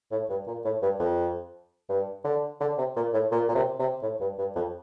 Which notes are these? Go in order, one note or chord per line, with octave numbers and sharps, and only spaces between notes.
A2
G2
A#2
A2
G2
F2
G2
D3
D3
C3
A#2
A2
A#2
A#2
C3
C3
A2
G2
G2
F2